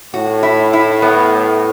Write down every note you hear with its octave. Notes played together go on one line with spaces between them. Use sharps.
A2 F#4
E4
E4
B3